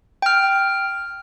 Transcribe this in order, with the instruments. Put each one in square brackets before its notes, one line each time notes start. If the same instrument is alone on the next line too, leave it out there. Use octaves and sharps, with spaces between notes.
[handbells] G5 F6